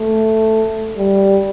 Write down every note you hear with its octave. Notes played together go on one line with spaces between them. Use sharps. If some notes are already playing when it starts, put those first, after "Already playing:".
Already playing: A3
G3